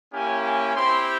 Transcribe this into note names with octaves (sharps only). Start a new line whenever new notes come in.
A#3 C#4 E4 G4 G#5
G#5
C4 E4 G4 C6